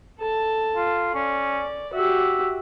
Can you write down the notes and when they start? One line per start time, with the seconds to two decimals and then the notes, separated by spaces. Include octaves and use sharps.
0.19 A4 A5
0.76 F4
1.15 C#4 D5
1.94 F#4 G4 E5